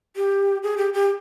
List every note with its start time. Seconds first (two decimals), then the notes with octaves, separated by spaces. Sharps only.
0.16 G4
0.63 G#4
0.78 G4
0.94 G4